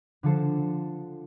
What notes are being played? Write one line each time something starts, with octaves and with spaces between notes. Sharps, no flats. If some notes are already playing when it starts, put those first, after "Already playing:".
D3 F3 A4 C5